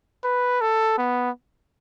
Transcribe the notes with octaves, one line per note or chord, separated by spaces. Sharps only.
B4
A4
B3